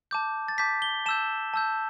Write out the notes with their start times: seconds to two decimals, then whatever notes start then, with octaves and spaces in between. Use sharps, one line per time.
0.11 A5 D6 G6
0.48 A6
0.58 A5 D6 G6 B6
0.82 G7
1.06 A5 E6 G6 E7
1.54 A5 E6 G6